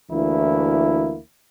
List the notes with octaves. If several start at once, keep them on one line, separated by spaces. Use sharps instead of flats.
D2 E3 A#3 E4